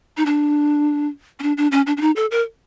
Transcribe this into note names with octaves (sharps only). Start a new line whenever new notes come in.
D#4
D4
C#4
D4
D4
C#4
D4
D4
D#4
A4
A#4